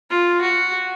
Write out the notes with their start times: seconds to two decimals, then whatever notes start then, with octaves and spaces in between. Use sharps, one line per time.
0.10 F4
0.41 F#4